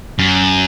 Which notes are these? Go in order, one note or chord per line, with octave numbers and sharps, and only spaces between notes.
F#2